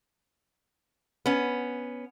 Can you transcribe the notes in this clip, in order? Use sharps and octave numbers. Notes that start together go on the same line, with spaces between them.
B3 C#4